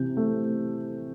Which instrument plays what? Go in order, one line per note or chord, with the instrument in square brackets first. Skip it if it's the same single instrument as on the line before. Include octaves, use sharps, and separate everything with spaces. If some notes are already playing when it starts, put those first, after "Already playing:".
Already playing: [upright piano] C3 E3 [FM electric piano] C4
[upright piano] A3